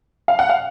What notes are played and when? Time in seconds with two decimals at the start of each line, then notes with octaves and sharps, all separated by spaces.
0.28 F5
0.39 F#5
0.49 F5